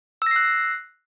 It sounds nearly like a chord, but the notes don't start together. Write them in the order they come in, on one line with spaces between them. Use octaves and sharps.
E6 A#6 C7 F#6